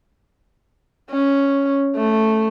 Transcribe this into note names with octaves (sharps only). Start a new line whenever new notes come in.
C#4
A3